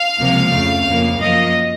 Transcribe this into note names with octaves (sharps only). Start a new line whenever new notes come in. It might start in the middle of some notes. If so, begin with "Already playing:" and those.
Already playing: F5
C#2 C3 F3 A#3
F2 C#3 A3
F2 C#3 F3 A#3
F#2 F3 A#3 D#5